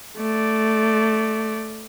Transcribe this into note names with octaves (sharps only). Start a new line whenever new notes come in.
A3 D5